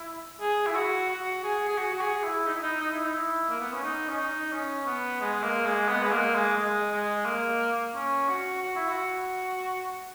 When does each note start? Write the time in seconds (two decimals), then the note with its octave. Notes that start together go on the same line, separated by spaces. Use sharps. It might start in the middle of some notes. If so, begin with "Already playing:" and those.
Already playing: E4
0.41 G#4
0.67 E4
0.75 F#4
1.09 F#4
1.43 G#4
1.69 G#4
1.78 F#4
1.93 F#4
2.01 G#4
2.23 E4
2.46 D#4
2.54 E4
2.63 D#4
2.81 D#4
2.92 E4
3.04 D#4
3.14 E4
3.49 A#3
3.60 B3
3.73 C#4
3.83 D#4
4.09 C#4
4.18 D#4
4.52 C#4
4.86 B3
5.21 G#3
5.43 A#3
5.66 G#3
5.89 B3
6.03 G#3
6.12 A#3
6.35 G#3
6.57 G#3
6.92 G#3
7.26 A#3
7.95 C#4
8.29 F#4
8.63 F#4
8.76 E4
8.88 F#4